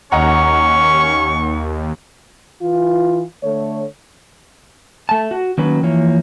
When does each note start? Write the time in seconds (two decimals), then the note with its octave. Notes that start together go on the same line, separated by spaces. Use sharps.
0.12 D#2 C#4 D#5 F#5 A#5 C#6
2.62 E3 F4
3.44 D3 A3 C#5
5.09 A3 A5
5.31 F#4
5.58 D#3 F#3 A#3 C#4 B4
5.83 E3 F3 A#3 C#5